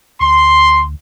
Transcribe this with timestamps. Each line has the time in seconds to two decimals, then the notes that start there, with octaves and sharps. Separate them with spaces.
0.21 D2 C6